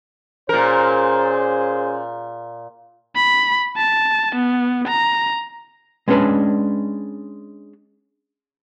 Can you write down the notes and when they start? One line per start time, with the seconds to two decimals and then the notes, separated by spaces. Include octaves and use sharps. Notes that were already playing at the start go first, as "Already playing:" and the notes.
0.49 A#2 C#4 G#4 A#4 C5
3.16 B5
3.76 A5
4.35 B3
4.88 A#5
6.08 G#3 B3 C#4 D4 B4 D5